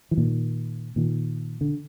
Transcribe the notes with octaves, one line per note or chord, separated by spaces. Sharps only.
E3
A#2 D#3
A#2 D#3
D3